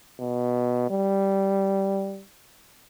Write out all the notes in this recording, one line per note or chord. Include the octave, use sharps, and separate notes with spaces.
B2
G3